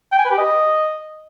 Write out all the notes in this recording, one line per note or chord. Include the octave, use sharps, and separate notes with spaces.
G5
G#5
B4
G4
D#5